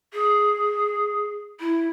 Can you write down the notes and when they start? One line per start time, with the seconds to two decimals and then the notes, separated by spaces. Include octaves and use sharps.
0.13 G#4
1.60 E4